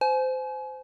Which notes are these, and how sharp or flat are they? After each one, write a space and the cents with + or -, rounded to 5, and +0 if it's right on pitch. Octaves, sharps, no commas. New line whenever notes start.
C5 -20 G#5 +35